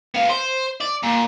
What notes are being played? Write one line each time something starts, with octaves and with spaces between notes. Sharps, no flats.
B3 F5
C5
D5
A#2